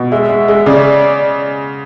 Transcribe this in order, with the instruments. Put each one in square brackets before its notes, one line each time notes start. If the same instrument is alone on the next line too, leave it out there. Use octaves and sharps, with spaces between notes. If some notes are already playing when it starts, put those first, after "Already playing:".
Already playing: [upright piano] B2
[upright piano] G#3 [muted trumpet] E5
[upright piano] G#3
G#3
[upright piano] C#3 [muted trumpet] D5